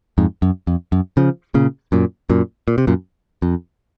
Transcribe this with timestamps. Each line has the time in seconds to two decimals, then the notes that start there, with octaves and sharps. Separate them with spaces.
0.18 F2 G#2
0.42 F#2
0.67 F2
0.92 F#2
1.17 C#3 F3
1.54 A#2 C#3
1.92 F#2 A#2
2.30 F#2 A#2
2.68 A#2
2.78 C3
2.87 F#2 A#2
3.42 F2